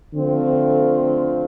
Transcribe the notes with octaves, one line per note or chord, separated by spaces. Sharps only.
D3 F3 A3 C4 F4